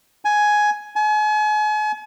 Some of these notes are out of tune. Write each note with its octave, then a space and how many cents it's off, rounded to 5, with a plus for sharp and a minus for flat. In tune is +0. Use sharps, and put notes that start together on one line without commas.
G#5 +10
G#5 +40